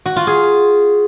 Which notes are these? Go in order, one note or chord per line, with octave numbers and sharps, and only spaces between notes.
F#4
F4
G#4